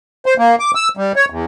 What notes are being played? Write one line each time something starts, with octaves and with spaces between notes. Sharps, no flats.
C5
A#3
D6
E6
G3
C#5
E2